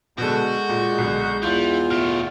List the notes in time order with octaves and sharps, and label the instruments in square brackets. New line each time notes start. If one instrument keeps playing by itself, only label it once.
[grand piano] B2 D3 A4 [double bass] G#3 [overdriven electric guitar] F#4 [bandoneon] G6
[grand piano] A#2
B1 D3
[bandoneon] E2 F4 [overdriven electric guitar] E3 [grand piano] G6
[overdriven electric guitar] B2 A3 [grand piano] F6